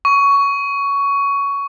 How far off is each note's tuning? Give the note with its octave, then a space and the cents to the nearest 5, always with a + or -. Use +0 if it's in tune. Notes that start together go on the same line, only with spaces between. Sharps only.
C#6 +15